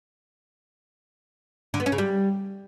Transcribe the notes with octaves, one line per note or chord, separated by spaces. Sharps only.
D3
B3
C#4
C#3
G3